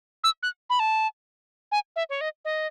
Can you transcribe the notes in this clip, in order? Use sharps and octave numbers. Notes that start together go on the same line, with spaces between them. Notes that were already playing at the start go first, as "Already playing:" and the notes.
E6
F#6
B5
A5
G#5
E5
C#5
D#5
D#5